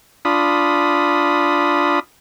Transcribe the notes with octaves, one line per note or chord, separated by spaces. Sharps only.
D4 F4 B5 D#6